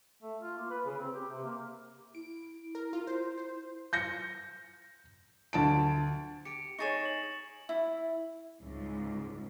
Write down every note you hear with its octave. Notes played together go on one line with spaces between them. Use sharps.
A3
F4
A#3
B4
C#3
C4
G4
C3
A#3
E4 D7
A#4
E4 F4
C5
C5
G6 A#6 C#7
D2 A5 D7
G4 C#7 D7
D#4 G#4 C#5 C#6 A6 E7
F#7
E4
C#2 G#2